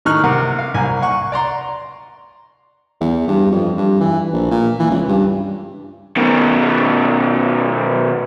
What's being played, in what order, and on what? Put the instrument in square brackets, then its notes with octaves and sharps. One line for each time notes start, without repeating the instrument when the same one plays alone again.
[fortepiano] A2 D#3 D#4 C#6 F6 F#6
C3 A#4 F#5
F5
C2 A#3 G#5
F#5 C#6
D5 A#5 C6
[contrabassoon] E2
G2
F2
G2
E3
A#1
A#2
E3
C#2
G2
[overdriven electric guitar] B2 D#3